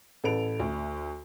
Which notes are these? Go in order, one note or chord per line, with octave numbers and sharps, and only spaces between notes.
A1 A4 B4 D7 F7
D2